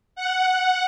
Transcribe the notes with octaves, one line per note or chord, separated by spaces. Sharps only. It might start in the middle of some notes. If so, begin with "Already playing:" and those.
F#5